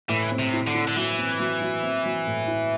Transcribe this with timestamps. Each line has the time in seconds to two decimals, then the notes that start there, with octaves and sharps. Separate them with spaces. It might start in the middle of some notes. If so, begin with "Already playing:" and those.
0.09 A2 E3
0.32 C4
0.39 C3
0.53 E4
0.67 D3
0.74 E4
0.88 D3
0.96 E3 F#3
1.19 C4
1.39 F#3
1.62 F#3
1.83 C4
2.05 F#3
2.27 A2
2.47 E4